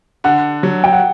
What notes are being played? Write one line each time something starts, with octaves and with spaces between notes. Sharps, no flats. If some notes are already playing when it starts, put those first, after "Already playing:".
D3 F#5
F#3
G5
F#5